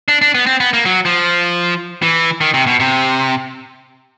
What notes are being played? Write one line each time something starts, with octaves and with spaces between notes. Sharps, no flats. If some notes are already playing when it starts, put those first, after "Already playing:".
D4
D4
B3
C4
B3
A#3
F#3
F3
E3
D#3
C3
B2
C3